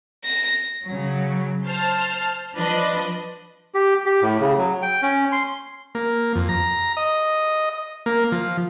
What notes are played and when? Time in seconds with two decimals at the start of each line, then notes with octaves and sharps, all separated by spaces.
0.24 A#6
0.87 C#3 F#3
1.66 C5 A5 F6
2.56 F3 D4 B4 D#5
3.74 G4
4.06 G4
4.22 A2
4.41 C#3
4.58 F#3
4.82 G5
5.02 C#4
5.32 C6
5.95 A#3
6.35 F2
6.49 A#5
6.97 D#5
8.06 A#3
8.32 F3